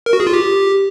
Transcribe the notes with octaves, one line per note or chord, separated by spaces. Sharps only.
A#4
F#4
G#4
F4
G4